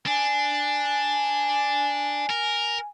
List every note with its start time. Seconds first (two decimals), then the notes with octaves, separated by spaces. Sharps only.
0.06 D4 G#5
2.30 A#4